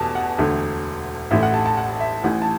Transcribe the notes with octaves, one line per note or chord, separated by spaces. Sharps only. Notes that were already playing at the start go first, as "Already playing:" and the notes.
Already playing: E2 B2 A3 A5
F#5
E1 D2 D3 A3
A1 A2 A3 E5
F#5
A5
A5
F#5
E5
A1 A2 E3 F#5
A5